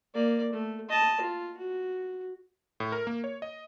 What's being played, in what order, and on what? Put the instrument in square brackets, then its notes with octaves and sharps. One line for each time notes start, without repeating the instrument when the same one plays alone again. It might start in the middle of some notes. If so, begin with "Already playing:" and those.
[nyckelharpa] A#3 D5
A3
D#5 A5
F4
F#4
[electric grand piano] A2
A#4
A#3
C#5
D#5